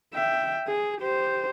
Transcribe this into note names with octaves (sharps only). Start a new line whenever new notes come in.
E5 G5
G#4
G4 C5